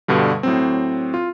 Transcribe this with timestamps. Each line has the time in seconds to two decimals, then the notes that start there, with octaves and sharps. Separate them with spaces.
0.08 G2 B2 D3 G3
0.43 A2 F#3 C4
1.14 F4